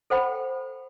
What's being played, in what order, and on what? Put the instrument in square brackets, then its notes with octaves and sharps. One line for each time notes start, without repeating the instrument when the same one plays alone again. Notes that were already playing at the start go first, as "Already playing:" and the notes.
[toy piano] A4 C5 F#5 G5 B5